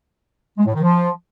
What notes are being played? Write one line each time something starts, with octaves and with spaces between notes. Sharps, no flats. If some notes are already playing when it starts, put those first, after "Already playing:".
G#3
A2
D#3
F3